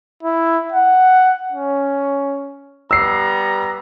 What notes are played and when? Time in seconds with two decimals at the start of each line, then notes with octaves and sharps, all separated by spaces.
0.23 E4
0.72 F#5
1.52 C#4
2.91 G3 B3 A#5 E6 C7